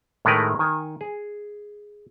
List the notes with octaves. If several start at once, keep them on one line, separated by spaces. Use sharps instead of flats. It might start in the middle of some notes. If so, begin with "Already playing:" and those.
A2 D#3 G#3 A3 A#4 B4
D#3 G#5
G#4